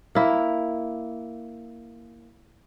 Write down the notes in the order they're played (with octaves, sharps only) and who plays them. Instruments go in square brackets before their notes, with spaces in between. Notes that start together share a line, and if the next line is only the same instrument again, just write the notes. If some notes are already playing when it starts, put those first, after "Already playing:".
[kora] A#3 E4